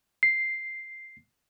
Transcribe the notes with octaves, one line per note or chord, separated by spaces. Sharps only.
C7